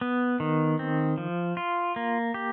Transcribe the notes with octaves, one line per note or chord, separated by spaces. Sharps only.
B3
D#3
C4
F3
F4
A#3
G4